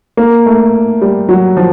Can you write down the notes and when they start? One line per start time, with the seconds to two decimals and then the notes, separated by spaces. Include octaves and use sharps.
0.17 A#3
0.46 A3
1.02 G3
1.29 F#3
1.57 F3